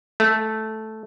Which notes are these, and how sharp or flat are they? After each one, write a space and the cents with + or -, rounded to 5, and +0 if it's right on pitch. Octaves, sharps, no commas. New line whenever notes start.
A3 -5